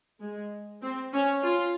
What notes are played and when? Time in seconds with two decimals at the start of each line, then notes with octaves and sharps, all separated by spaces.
0.21 G#3
0.82 C4
1.14 C#4
1.43 F4